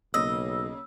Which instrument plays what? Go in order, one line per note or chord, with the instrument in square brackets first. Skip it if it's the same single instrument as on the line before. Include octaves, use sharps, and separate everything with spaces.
[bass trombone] B1 [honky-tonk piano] C#3 A#3 [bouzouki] D#5 [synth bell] E6